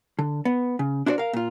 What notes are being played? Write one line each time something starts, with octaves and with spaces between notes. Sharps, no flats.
D3
B3
C#3
D4 E4 F#4 C5 D5
A#4 F5
A#2 F4